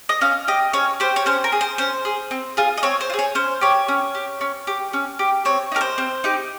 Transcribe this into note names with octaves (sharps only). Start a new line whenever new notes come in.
D#5
C#4 F5
G4 D#5
C#4 C#5
G4 C5
C#5
C#4 C5
A#4
G#4
C5
C#4 C5
G#4
C4
F4 G#4
D#5
C4 C#5
C5
F4
G#4
C#5
C#4 C5
G4 C#5
C#4
G4
C#4
G4
C#4
G4
C4 C#5
D#4 G4 A#4
C5
C4
D#4 G4